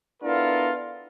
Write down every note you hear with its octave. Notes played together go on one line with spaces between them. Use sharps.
B3 D4 E4 F4 A4 A#4